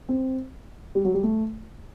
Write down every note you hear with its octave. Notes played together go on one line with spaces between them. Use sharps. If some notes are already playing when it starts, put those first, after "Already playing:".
C4
G3
F#3
G3
A3